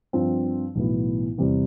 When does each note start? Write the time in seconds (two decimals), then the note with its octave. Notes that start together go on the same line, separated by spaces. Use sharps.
0.13 G2 F3 C4
0.75 B1 A2 E3 B3 E4
1.38 E2 C3 G3 C4